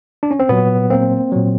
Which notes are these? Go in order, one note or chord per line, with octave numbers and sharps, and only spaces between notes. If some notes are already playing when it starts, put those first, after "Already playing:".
D4
C#4
C4
A#2 F#3 B3
A#3 C4
A#2 F#3